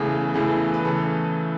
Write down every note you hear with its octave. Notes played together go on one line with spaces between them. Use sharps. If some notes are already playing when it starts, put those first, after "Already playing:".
Already playing: E2 C#3 E3 A3 G#4
E2 C#3 E3 A3 G#4
B4
C#3 E3 A3 A4